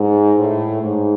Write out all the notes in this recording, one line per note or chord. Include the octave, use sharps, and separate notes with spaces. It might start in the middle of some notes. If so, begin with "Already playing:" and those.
Already playing: G#2
A2
G#2